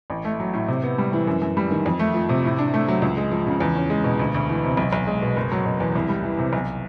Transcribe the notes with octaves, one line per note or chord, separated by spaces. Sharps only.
A1
A3
F#3
A2
C3
B3
G3
E3
F#2
F#2
G3
D#3
F2
A3
F3
C3
A2
D4
A3
F#3
C#2
G#3
F3
C#3
E2
C#4
G#3
B2
D2
D2
E3
C3
B1
B1
G#3
B2
F#1
F#3
B2
E2
C2
G3
E3
C3
B1